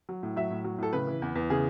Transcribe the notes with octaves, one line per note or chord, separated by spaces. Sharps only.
F#3
A2
F#3 E5
A2
F#3
A2 A4
C#3 B4
E3
E2
E2
C#3 G#4